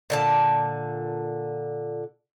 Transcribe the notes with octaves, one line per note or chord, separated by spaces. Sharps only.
A#2 D3 A5